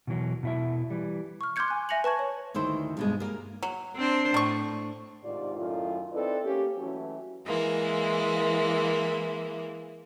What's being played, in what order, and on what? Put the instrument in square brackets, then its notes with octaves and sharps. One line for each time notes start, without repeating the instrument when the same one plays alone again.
[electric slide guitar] B2 E3 F#3
B2 E4 E5
E3 G3
[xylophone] C#6 F6
C6 D6 F6 G6 G#6 C#7
G#5 F#6
E5 G#5 A#6 C#7 F7 F#7
B4 A5 C#6 G#6
C#5
[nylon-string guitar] D2 D#3 E4 C5
G2 B2 G#3
A#3 A#4
[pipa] F#3
[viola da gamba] C4 D4 C5
[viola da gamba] A2 [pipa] D4 C#6
[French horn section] G#2 C3 D#3 F4 D5
F#2 A2 D#3 F4
C4 D#4 E4 A4 B4 D5
A#3 C#4 G4
E3 F#3 A3 C#4
[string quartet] E3 G#3 A#3 E4